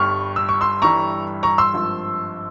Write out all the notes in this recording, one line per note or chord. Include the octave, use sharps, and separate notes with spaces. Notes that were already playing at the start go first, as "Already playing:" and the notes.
Already playing: G1 G2 G3 C#6 F6
E6
C#6
C6 E6
G1 G2 E3 G3 A#5 C#6
A#5 C#6
C6 E6
G#1 G2 F3